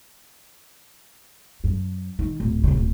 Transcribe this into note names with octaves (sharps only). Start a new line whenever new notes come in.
F#2
D#3
D1
A#1 C#3
D1